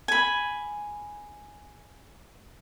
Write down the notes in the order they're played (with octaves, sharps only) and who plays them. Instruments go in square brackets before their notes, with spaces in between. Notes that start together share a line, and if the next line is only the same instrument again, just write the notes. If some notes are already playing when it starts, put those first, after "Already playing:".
[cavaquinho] G#5 B5